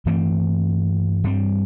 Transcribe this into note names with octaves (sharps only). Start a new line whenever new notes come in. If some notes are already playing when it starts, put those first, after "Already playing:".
G2 E3 A3 C4
G2 G3 C4